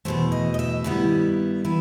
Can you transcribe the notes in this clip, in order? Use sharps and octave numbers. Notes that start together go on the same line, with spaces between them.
E2 B2 F#3 A3 C5
D#5
D#5
E5
G2 D#3 G3 B3 E4
E3 B3 E4